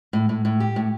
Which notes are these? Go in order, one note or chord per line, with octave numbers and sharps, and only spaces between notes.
A2
A2
A2
G4
A2